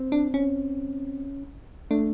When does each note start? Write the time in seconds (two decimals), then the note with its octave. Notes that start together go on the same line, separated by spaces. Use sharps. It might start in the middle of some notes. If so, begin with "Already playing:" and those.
Already playing: C4
0.12 D4
0.34 C#4
1.91 A3 D4